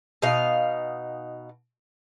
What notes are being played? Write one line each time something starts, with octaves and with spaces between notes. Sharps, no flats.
B2 D#4 F5